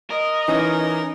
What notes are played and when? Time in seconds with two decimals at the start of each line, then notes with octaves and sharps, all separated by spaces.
0.10 A#4 D#5
0.48 E3 C#4 D#4